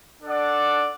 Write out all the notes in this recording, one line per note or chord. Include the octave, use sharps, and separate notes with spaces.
D4 A4 D5 F#5